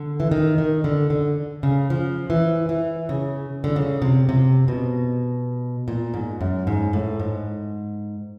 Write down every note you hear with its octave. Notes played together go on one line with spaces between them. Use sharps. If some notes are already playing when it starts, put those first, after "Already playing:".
Already playing: D3
E3
D#3
D#3
D3
D3
C#3
F3
E3
E3
C#3
D3
C#3
C3
C3
B2
A#2
G#2
F#2
G#2
A2
G#2